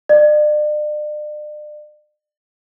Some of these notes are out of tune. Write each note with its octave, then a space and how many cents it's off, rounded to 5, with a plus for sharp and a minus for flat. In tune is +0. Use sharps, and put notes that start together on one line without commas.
D5 +40